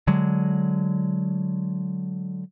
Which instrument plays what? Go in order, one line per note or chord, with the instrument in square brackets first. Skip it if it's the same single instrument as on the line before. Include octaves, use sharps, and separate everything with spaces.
[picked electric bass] D3 F#3 G#3